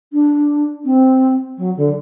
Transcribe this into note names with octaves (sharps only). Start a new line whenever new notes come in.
D4
C4
F#3
D3